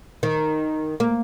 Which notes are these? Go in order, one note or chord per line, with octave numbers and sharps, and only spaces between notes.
D#3
A#3